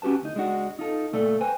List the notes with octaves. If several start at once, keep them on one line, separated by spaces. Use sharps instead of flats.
C#4 F#4 G4 B4 A5
D2 D#4
C#2 G#3 D4 F#4
D#4 F4 A4
C#2 A#2 A3 A4 D5
B4 C5 G5 G#5